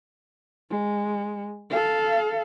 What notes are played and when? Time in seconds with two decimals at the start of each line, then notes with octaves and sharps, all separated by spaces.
0.70 G#3
1.70 A4 F5